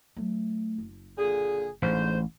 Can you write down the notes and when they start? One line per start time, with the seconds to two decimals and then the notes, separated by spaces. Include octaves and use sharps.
0.16 F#3 A3
0.78 F#1
1.18 A#2 D3 G#4
1.82 A1 G#2 D3 C5